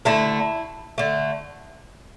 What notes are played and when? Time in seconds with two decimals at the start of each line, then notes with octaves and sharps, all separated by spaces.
0.05 D3 A3 E4
0.98 D3 A3